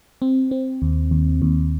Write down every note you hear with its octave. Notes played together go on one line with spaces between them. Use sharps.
C4
C4
D#2
D#2
D#2